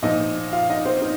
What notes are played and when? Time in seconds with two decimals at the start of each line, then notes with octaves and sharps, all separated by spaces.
0.02 A#2 F3 D#4 D#5
0.52 F4 F5
0.70 D#4 D#5
0.85 C4 C5
1.02 D#4